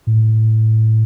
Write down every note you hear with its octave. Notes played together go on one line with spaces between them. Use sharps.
A2